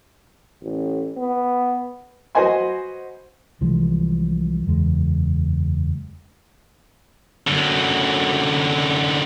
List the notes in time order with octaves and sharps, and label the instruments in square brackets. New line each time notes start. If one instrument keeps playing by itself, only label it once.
[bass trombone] A1
B3
[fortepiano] F#4 B4 C5 D#5 G#5 C6
[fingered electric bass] C2 E3 F3 G#3
F#1 E2 G#3
[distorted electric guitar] F#2 D3